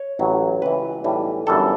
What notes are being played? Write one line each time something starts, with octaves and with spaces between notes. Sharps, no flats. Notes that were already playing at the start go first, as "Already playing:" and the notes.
Already playing: C#5
A1 A2 F#3
C#2 C#3 E3 B4
B1 A2 E3 G3
G1 F#2 E3 G3 A4